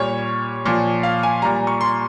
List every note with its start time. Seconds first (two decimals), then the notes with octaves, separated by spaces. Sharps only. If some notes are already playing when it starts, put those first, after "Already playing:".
Already playing: A#2 G3 C#5
0.65 A#2 F3
1.03 F5
1.23 G#5
1.42 A#2 G3 A#5
1.67 C#6
1.81 C6